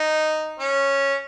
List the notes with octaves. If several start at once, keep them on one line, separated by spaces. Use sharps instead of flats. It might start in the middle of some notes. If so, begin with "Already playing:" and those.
Already playing: D#4
C#4